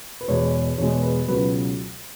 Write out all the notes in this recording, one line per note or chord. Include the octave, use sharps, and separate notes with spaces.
B4
E2 B2 G#3 C#5
E2 B2 G#3 C#5
B4
C#2 B2 F#3 B4